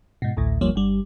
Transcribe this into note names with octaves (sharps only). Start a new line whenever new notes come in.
G#2 B2
A1 D2 A2
G1 D#2 F3 G3 A#3 C#5
G1 G3